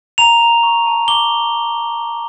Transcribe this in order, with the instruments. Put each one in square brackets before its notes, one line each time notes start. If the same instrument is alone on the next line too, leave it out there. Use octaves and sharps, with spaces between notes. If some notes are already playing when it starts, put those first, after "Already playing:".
[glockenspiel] A#5 F7
A#5
C#6
A5
D6 G7